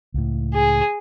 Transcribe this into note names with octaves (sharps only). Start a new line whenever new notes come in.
C#2 A2
G#4